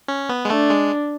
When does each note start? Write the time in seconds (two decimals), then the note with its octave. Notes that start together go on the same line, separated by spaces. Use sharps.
0.08 C#4
0.29 B3
0.45 G#3
0.49 A3 D4
0.70 G#3